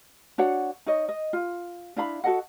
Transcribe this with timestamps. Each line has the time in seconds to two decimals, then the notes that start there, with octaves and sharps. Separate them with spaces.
0.38 D4 F#4 C#5 F#5
0.86 D#4 C#5 D#5
1.09 D#5
1.33 F4
1.96 D4 E4 F5 B5
2.24 F#4 A4 D#5 F#5